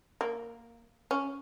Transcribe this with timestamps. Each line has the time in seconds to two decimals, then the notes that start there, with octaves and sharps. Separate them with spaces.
0.21 A#3
1.11 C#4